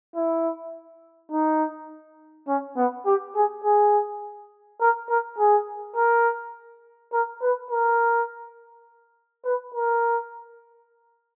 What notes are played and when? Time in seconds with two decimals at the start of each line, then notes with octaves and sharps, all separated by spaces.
0.16 E4
1.32 D#4
2.48 C#4
2.77 B3
3.06 G4
3.35 G#4
3.64 G#4
4.81 A#4
5.10 A#4
5.39 G#4
5.96 A#4
7.13 A#4
7.42 B4
7.71 A#4
9.45 B4
9.75 A#4